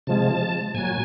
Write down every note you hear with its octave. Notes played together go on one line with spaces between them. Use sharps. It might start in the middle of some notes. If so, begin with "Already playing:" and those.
C3 F3 G#3 A5
A#2 F#3 G#5